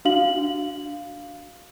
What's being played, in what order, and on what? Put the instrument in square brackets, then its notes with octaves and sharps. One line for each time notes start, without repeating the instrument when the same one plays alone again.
[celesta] D4 F#4 F5 F#7